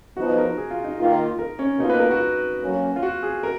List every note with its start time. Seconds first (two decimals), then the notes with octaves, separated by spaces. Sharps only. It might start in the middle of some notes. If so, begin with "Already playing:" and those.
0.17 F3 B3 D#4 F#4
0.38 A#4
0.58 G#4
0.71 F4
0.84 D#4
0.98 D#3 A#3 F4
1.39 A#4
1.59 C#4
1.79 B2 A#3 D#4 F4
1.90 B4
2.00 A#4
2.11 F#4
2.62 F#3 A#3 C#4
2.96 F4
3.02 F#4
3.23 G#4
3.43 A#4